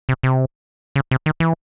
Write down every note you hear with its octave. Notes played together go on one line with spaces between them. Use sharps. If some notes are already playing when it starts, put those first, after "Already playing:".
C3
C3
C#3
C3
D#3
E3